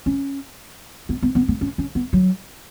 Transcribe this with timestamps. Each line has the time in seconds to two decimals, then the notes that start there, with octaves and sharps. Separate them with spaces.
0.06 C#4
1.09 B3
1.22 B3
1.35 B3
1.48 B3
1.61 C#4
1.78 C#4
1.95 B3
2.13 F#3